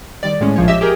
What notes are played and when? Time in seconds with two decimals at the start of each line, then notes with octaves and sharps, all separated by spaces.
0.23 D#3 G3 D5
0.40 A2 G#3 C#4
0.56 A#1 F3 C#5
0.68 G4 D#5 E5
0.81 G4 G#4 A#4